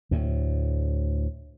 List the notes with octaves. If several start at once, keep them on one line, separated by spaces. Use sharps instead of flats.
D2 A2